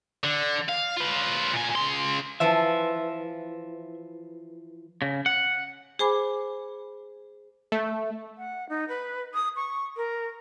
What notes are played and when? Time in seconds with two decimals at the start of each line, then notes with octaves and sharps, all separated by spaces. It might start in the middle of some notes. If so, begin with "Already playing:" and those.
0.24 D3
0.68 F5
0.96 F4 B4
1.54 A#2 G#5
1.76 C#3 C6
2.40 E3 F3 F4 E5
5.02 C#3
5.26 F#5
5.99 G#4 C5 G#5 B5 D6
7.72 A3
8.38 F#5
8.69 D#4
8.88 B4
9.34 D#6
9.56 C#6
9.97 A#4